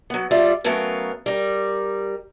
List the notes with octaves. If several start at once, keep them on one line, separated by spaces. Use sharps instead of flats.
F#3 B3
G3 F4 D5 E5
F#3 A3 B3 C#4 A#4 F5
G3 A#4